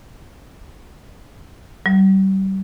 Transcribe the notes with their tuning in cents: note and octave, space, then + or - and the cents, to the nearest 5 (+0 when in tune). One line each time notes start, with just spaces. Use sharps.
G3 -35